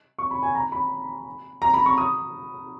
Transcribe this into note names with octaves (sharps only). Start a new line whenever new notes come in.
C#6
B5
G#5
A#5
B5
A#5
B5
C#6
D#6